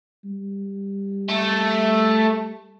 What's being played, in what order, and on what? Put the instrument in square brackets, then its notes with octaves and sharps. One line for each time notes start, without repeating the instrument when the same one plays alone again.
[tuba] G3
[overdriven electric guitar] A3